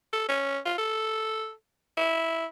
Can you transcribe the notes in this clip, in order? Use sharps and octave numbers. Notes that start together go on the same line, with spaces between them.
A4
C#4
F4
A4
E4